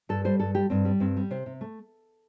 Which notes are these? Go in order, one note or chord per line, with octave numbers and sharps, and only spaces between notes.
G2 A4
G3 C5
G2 A4
G3 G4
G2 C4
G3
G2 C4
G3
C3 C5
C3
A3